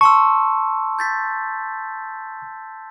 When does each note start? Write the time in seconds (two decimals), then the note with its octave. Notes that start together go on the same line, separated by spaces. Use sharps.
0.01 A5 C6 C#6 E6
0.99 G6 A6 B6